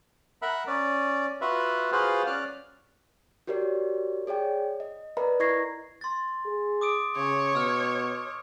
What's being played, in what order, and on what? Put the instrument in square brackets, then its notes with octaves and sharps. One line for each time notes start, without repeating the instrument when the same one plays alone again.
[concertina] A#4 E5 F#5 B5
C#4 D5
F4 F#4 B4 E5
F4 F#4 G#4 B4 C5 F5
C#4 D5 F6 F#6
[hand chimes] F#4 G4 A#4 C#5 D5
G#4 C#5 D5 G5
D#5
A#4 B4 D5 D#5 A#5 B5
E4 D#5 C#6 G#6 A#6 C7
[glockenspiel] C6 A6
[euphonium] G#4
[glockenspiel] D6 D#6 D7
[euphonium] C#3 [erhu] C#5
[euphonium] B2 [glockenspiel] E6 F6